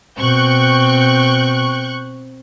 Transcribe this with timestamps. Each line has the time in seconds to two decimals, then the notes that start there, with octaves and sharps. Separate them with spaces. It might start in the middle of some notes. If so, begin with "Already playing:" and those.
0.19 B2 C4 G5 C#6 F#6 G6